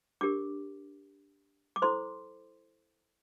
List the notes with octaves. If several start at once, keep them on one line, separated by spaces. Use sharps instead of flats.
D4 G4 A#4 D6
D6
E4 A4 C5 C6